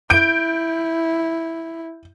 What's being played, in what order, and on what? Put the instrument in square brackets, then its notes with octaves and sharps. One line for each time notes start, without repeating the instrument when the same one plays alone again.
[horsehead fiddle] E4 [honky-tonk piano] G6 D7